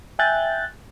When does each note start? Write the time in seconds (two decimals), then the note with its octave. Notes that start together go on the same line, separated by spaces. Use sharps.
0.19 E5 G5 G#5 F#6 G6 A6